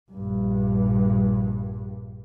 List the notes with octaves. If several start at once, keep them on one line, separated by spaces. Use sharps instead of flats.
A#1 G2